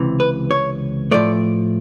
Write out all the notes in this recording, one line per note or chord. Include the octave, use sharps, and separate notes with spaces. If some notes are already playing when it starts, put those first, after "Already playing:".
Already playing: C#2 C3 E3
B4
C#5
A2 F3 A3 D5